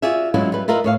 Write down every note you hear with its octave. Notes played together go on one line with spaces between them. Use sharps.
F4 F#4 G#4 D5 E5
F#3 G#3 C#4 E4 F4
G3 B4
E4 F4 A#4 B4 D#5
A2 C#5 F5